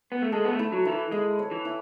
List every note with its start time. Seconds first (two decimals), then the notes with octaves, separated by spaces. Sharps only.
0.12 B3
0.22 A3
0.32 G#3 A4
0.44 B3
0.53 A3
0.59 E4
0.72 F#3
0.85 D#3 E4
0.92 E3
1.11 G#3 E4
1.39 C#5
1.51 E3
1.65 E4